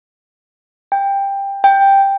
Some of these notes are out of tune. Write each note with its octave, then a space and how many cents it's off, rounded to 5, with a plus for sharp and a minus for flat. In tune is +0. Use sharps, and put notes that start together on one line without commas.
G5 +15
G5 +5